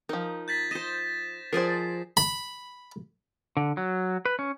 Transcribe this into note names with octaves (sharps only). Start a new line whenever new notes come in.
F3 D#4 A#4
G6 A6 B6
C5 D#5 A#6 E7
F3 G#4 A#4 C5 D5 C7
B5
D3
F#3
B4
C#4